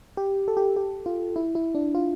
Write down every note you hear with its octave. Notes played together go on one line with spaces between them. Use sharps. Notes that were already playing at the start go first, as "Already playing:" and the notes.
G4
A4
G4
G4
F4
E4
E4
D4
F4